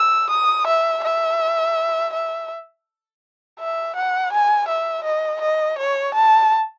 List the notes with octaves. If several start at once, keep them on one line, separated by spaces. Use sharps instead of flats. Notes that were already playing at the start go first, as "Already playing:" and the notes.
Already playing: E6
D#6
E5
E5
E5
E5
F#5
G#5
E5
D#5
D#5
C#5
A5